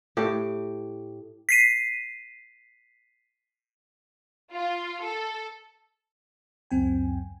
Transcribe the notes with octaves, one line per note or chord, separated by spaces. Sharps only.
A2 G4
B6 C7 D#7
F4
A4
C#2 F#2 C4 G5 G#5